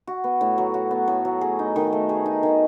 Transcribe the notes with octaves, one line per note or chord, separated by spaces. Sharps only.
F#4
B3
A2
F#3
F#4
B3
A2
F#3
G#4
D#4
D#3
A3
G#4
D#4
D#3